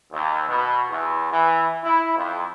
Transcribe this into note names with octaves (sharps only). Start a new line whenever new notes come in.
D#2
B2
E2
E3
E4
F2